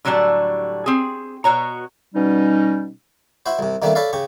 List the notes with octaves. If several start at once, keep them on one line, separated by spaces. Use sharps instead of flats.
A2 D3 F#3 G3 D5 A5
C4 G#4
B2 F#4 C#5 A#5
B2 G3 C#4 D#4
E4 F#4 C5
C2 C3
C3 D#3 G3 A3 A#3 D4
A4 B4 C#5 D5 F5
C#3 G4 C#6